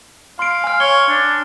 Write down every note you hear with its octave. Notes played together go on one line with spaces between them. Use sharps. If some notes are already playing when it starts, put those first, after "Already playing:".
F5 C6 D7
G#5 F6
C#5 G7
D4